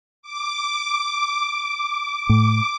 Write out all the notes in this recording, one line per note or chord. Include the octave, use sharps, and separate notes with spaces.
D6
A2